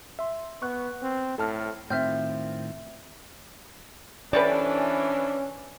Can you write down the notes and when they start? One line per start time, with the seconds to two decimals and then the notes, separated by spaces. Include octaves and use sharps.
0.19 E5 C6
0.62 B3 C#6 F#6
1.02 C4
1.38 A2 A4 A5 F6
1.90 A2 D#3 C4 F4 E5 F6 G6
4.33 C3 E3 C#4 D4 A4 B4 D5